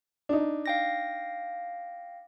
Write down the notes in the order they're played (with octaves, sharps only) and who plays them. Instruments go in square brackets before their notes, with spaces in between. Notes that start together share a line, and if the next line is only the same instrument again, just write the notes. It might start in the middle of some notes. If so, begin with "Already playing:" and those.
[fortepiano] D4 D#4
[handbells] F5 G5 A#6